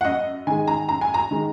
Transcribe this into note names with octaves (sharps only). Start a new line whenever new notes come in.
F#5
F#2 D#5
D#3 G#3 G#5
A#5
F#2 A#5
G#5
A#5
D#3 G#3